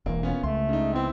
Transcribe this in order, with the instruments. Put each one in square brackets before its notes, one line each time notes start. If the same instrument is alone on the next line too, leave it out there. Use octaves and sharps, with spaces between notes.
[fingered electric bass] E1 E2 [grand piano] A#3
[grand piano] B3 C#4 F4
[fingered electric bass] C#2 [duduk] A3 [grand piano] C6
[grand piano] C#3 D#4
[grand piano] B3 E4 [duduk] C4